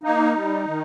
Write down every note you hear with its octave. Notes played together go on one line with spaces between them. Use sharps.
A#3 D#4
G3
D#3